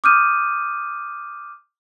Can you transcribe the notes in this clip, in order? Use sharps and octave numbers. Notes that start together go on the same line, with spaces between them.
D6 D#6 F6 G6 D#7